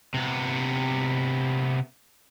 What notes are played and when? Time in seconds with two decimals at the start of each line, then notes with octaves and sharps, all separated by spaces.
0.14 C3 B3